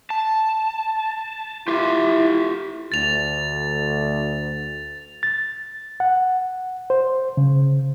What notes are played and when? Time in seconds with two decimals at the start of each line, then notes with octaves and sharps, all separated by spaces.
0.10 A5
1.68 E4 F4 G4
2.92 D2 A6 F7
5.23 A6
6.00 F#5
6.90 C5
7.37 C#3